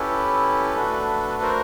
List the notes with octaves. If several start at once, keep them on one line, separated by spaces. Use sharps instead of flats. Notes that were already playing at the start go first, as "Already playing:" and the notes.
Already playing: C#4 E4 G4 A4 B4
A3 D4 F#4
A#4 C5